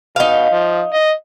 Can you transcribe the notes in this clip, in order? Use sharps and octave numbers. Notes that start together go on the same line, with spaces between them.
B2 D#4 F5
F3
D#5